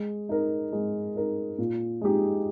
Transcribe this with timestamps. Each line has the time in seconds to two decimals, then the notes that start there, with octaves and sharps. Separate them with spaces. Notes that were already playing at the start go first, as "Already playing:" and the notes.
Already playing: G#3
0.29 D#4 A#4
0.73 G#3
1.16 D#4 A#4
1.58 A#2
2.01 G#3 D#4 G4